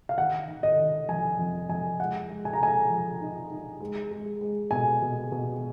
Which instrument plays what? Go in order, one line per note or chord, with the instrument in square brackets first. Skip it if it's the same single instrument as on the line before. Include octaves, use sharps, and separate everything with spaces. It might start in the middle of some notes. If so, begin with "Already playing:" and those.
[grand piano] F5
[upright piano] D#3 [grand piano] F#5
[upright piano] D#3
[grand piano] D#5
[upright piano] D#3
[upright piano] F2 [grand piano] G#5
[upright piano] F2
[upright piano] F2 [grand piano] G#5
[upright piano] G#3 [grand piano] F#5
[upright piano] G#3
[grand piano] G#5
A#5
[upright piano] G#3 [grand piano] G#5
[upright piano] F3
D#4
D#4
G#3
G#3
G#3
[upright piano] B2 [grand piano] G#5
[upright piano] B2
B2